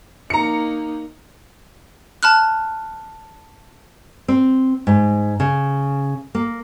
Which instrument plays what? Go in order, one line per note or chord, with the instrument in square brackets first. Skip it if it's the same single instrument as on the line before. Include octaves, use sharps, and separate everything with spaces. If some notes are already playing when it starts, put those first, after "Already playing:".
[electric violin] A#3 D#4 [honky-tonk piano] A#5 C#7
[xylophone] A5 B5 F6 F#6
[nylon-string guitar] C4
G#2
C#3
A#3